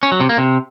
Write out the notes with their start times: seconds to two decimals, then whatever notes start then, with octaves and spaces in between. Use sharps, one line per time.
0.03 C#4
0.12 F#3
0.20 C3
0.29 A#3
0.38 C3